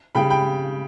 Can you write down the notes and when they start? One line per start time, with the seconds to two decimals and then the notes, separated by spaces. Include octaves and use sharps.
0.15 C#3 G3 G5 B5
0.30 G5 B5